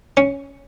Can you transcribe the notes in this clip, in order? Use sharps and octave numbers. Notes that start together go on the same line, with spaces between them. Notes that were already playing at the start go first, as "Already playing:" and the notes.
C#4